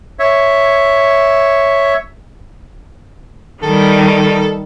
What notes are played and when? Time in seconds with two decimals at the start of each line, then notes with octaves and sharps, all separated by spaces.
0.19 C#5 E5
3.63 D#3 G3 A4